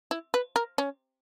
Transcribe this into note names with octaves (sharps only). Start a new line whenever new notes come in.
E4
B4
A#4
C#4